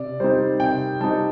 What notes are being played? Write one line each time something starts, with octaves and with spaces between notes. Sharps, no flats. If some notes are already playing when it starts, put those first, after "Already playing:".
Already playing: C3 D5
G3 C4 D#4 C5
C3 G5
G3 C4 D#4 A5